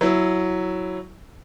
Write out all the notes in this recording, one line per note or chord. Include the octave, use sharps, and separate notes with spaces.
F#3 E4